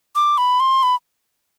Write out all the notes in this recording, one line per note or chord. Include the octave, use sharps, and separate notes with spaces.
D6
B5
C6
B5